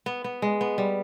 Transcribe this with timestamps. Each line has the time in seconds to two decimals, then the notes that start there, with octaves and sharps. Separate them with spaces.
0.06 B3
0.24 B3
0.42 G#3
0.61 B3
0.78 G3